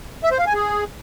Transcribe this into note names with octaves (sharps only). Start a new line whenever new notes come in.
E5
C5
F5
G#5
G#4